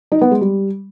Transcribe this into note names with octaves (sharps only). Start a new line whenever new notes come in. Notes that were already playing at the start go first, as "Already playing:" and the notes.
D#4
B3
G#3
G3